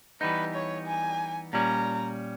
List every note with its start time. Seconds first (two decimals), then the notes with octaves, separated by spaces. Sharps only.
0.21 E3 G3 B3 D#4 B4
0.55 C#5
0.87 G#5
1.53 A#2 G3 C#4 A#5